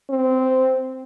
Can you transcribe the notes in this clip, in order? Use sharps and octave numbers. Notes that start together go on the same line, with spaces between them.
C4